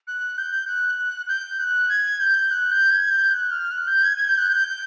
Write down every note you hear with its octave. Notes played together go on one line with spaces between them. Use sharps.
F#6
G6
F#6
G6
F#6
G#6
G6
F#6
G6
G#6
G6
F#6
F6
F#6
G6
G#6
G#6
G6
F#6
G6